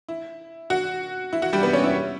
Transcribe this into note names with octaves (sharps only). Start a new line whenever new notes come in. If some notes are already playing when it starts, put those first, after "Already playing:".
E4
F#4
E4
F#4
G3 G4
B3 B4
C#4 C#5
E4 E5